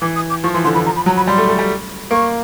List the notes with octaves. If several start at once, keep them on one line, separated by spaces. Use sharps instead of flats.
E3 D6
D#6
D6
F3 C#6
E3 C6
D3 C6
E3 B5
F3 A#5
B5
F#3 A#5
B5
G3 C6
A3
A3
G3
A#3 C#6